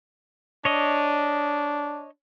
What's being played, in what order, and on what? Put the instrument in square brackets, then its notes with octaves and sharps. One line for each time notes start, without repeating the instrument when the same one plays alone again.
[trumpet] D4 [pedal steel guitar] C#5 D#5